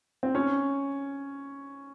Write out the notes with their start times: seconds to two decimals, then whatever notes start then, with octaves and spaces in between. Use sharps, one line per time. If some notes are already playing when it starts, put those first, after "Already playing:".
0.23 C4
0.35 C#4